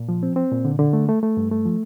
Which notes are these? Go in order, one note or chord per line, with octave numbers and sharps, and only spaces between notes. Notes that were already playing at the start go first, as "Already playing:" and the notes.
Already playing: A#2
F3
C4
C4
A#2
D3
D3
A3
A3
A3
G2
A3
F3